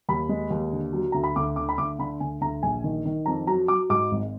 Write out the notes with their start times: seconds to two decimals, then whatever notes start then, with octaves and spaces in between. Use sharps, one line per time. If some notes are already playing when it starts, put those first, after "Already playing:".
0.09 D#2 B5
0.29 G#3
0.50 D#2
0.73 D3
0.93 F#3
1.12 D2 A#5
1.24 B5
1.36 D2 D6
1.56 D3 D6
1.69 B5
1.78 D2 D6
1.99 D3 B5
2.20 D2 G#5
2.41 D2 A#5
2.63 A#1 G#5
2.84 D#3
3.05 D#3
3.26 F2 A#5
3.47 F#3 A#5
3.68 F#3 D6
3.90 G#2 D6
4.11 G#1